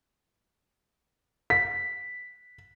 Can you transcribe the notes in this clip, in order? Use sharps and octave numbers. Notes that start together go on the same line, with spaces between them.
B6